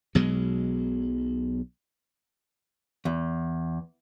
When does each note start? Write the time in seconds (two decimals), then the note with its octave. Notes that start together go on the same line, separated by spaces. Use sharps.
0.15 B1 B2 F#3 G#3
3.05 E2